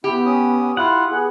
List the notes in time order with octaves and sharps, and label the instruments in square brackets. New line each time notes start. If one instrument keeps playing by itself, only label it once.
[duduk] B3 [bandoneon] E4 [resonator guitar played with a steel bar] G4
[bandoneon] C#4 D#6
[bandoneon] E4 F4 [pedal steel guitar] F#5
[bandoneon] B3 [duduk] G#4